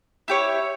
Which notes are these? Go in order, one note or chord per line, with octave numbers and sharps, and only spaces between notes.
E4 G4 C#5